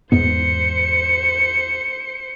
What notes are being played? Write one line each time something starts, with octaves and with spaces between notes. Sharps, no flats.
E2 G#2 B3 C5 C#7